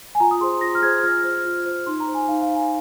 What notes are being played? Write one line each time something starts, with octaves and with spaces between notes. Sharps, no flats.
G#5
F4 A#5
D#6
G#4 C5 C6
F4 A#6
F6
G#4 C5 G#6
F4 F6
C5
F4
C5
D#4 C6
A#5
C5
G#5
D#4 F5
F5
C5
G#5